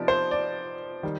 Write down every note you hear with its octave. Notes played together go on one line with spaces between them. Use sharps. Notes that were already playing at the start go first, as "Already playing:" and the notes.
Already playing: C3 F3 B3 D#4 D5
C5
D5
D#3 G3